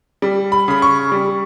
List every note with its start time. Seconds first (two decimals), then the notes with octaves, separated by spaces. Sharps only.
0.22 G3
0.52 B5
0.68 C#3 B5
0.82 C#6
1.12 G3